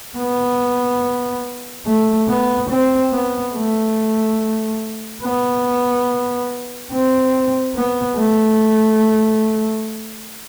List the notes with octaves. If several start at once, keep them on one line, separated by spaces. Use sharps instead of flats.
B3
A3
B3
C4
B3
A3
B3
C4
B3
A3